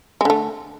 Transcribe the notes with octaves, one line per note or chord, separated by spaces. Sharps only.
D3 G#3 A3